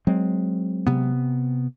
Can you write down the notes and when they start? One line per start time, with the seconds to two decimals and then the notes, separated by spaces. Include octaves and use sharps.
0.07 F#3 G#3 C4
0.87 C3 B3